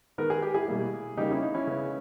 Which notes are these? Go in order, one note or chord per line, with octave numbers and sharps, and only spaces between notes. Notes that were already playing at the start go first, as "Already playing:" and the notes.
D#3 G#3 B3 A#4
G#4
G4
E4 G#4
B2 G3 A#3
C#3 G3 A#3 D#4 G4
C#4 E4
D#4
C#4 E4
C#3 G#3 B3